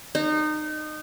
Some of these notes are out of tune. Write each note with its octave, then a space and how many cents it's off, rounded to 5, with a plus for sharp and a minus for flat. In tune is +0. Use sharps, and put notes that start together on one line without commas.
D#4 -25